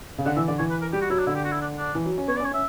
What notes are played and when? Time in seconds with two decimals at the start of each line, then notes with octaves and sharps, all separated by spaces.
0.18 C#3
0.26 D3 F#5
0.36 E3 E5
0.47 D3 D5
0.59 E3 C#5
0.70 B4
0.82 A#4
0.92 G3 G4
1.01 F#4
1.10 F#3 E4
1.18 D4
1.27 D3 E4
1.35 G4
1.44 F#4
1.52 E4
1.61 D4
1.78 D4
1.95 E3
2.06 F#3
2.18 C#4
2.28 B3 C#5
2.36 D5
2.40 C#4
2.45 C#5
2.51 C#4 E5